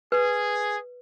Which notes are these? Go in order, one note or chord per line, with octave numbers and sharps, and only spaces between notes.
G#4 B4